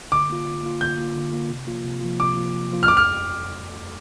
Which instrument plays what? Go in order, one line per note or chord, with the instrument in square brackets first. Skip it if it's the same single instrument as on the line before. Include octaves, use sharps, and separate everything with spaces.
[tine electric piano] D3 [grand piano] D6
[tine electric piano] A#3 F4
D3
A#3 F4
[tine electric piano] D3 [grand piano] G6
[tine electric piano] A#3 F4
D3
A#3 F4
C3
F3 A#3 F4
C3
F3 A#3 F4
[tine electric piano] C3 [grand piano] D6
[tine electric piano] F3 A#3 F4
C3
F3 A#3 F4
[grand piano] F6
[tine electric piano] F2 [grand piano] D6
[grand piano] F6